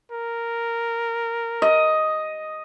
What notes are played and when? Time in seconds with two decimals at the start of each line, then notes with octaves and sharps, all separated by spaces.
0.11 A#4
1.62 D#5